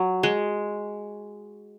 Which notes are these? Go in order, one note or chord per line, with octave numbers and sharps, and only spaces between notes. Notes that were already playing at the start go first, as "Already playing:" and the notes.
Already playing: F#3
G#3